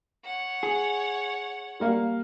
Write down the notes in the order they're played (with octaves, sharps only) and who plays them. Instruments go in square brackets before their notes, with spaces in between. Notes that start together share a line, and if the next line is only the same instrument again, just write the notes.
[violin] C#5 F#5
[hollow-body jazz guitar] G#4
[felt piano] G3 A#3 F5